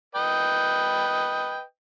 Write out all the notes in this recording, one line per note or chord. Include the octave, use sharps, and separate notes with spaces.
B4 D#5 G5